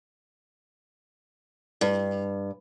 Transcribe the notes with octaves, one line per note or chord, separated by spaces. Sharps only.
G2